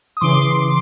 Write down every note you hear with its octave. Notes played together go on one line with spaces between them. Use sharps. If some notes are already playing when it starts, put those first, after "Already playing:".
D#6
C#3 E3 C6 D6